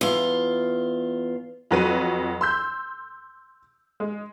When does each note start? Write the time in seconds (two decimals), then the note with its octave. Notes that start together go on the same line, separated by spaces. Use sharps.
0.01 E2 F4
1.71 F2 F#3 B4 D#7
2.41 C6 E6 G6
4.00 G#3